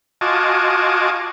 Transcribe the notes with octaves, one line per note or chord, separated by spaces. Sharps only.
F4 F#4 D#5 G#5 A5 D6